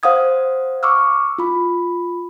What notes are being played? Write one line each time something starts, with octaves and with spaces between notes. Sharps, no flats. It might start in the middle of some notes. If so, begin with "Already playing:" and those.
C5 F5 F#5 D#6 G#6
C#6 D6 E6 F6
F4 B5